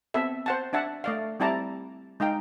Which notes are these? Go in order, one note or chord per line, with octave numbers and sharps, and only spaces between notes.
B3 C4 A4 E5
C5 F#5 A5
D4 E5 F#5 A5
A3 D5 F5
G3 C4 E4 D5 A5 A#5
G#3 D#4 F5 G5